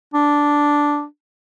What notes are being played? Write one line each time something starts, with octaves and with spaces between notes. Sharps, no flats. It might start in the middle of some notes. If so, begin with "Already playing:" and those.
D4